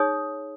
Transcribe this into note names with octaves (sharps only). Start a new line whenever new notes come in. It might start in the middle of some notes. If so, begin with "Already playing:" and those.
Already playing: D#4 G#4 C#5 D#6